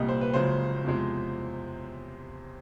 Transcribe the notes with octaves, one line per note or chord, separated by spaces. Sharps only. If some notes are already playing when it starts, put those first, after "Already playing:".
Already playing: C2 A#2 G3 D#5
C5
B4
F#1 F#2 C#3 F3 G#3 C5
E2 C3 F3 G#3